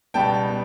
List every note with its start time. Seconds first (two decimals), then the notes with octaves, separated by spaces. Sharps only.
0.14 C#2 B2 G3 B3 G5 A5
0.49 B3